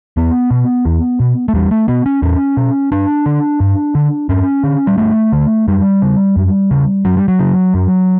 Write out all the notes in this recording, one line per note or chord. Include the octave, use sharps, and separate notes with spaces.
E2 B3
B2
E2
B2
A3
E2 G3
A3
B2 B3
C#4
E2 C#4
B2
G2 D4
D3
G2
D3
G2 C#4
D3
G3
G2 A3
D3
F#2 G3
C#3
F#2
C#3
F#2 F#3
G3
F#3
C#3
F#2